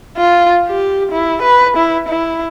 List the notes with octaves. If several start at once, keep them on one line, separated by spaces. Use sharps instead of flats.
F4
G4
E4
B4
E4
E4